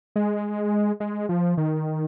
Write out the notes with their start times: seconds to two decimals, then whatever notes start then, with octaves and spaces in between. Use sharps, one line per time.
0.16 G#3
1.00 G#3
1.29 F3
1.57 D#3